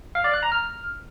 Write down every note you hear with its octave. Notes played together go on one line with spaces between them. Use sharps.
F5
D5
F#6
A#5
F6